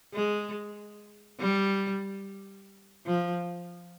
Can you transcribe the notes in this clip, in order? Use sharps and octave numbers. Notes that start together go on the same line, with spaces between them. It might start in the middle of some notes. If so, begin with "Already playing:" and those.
G#3
G3
F3